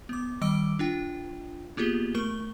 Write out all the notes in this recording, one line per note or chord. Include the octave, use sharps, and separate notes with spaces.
B3 D6
D#3 G3 D#5 D6 E6 D7
D4 F4 G5
A#3 B3 F4 G4 G#4 G7
A3 A#4 C#6 G7